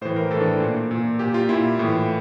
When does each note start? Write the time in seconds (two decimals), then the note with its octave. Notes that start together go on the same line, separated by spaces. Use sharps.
0.01 A2 E3 C5
0.16 A#4
0.31 A2 E3 A4
0.41 D4
0.60 A#2
0.91 A#2
1.19 A#2 G4
1.34 F4
1.49 A#2 E4
1.79 A2 E3